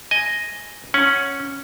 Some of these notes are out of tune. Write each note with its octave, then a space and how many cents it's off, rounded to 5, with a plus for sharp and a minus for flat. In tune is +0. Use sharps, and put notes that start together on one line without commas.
D#5 +0 G#5 +5
C#4 +0 F#5 -10